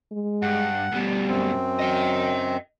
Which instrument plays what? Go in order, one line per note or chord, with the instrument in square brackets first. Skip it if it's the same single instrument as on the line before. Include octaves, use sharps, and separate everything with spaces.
[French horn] G#3
[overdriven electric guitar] G2 [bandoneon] F#5
[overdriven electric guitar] D2 B2 [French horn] G3
[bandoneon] F#2 C4
[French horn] F#3 [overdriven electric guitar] D#5 G5